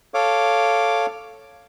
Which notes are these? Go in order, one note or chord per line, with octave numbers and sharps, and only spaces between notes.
A4 C#5 F5 D6